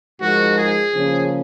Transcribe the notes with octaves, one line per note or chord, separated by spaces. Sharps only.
G#2 F3 G#3 D#4 F#4 A#4
G#4
C#3 F3 A#3 C#4